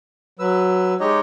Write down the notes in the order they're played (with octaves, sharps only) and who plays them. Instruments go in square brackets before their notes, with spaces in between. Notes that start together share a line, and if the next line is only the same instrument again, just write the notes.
[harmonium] F#3 [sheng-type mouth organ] B4 E6
[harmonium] G#3 C#5 [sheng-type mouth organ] D#4 G4 D#5